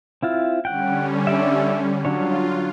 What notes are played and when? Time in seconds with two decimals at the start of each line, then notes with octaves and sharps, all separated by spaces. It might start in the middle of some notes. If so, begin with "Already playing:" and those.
0.23 C4 E4 F4
0.65 D3 G3 C#4 F#5 G5
1.27 D5 E5
2.05 F#3 D4 F4 C#5